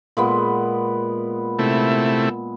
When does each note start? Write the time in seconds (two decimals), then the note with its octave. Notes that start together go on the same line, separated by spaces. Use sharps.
0.17 A#2 G#3 B3
1.59 C3 A3 E4